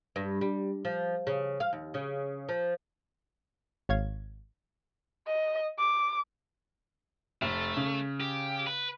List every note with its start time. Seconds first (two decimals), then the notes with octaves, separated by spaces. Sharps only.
0.16 G2
0.41 G3
0.85 F3
1.27 C#3
1.60 F5
1.73 D#2
1.94 C#3
2.49 F3
3.89 G#1 C#5 F5 G#6
5.27 D#5
5.78 D6
7.42 F1 A3
7.77 C#3
8.20 G4
8.67 B4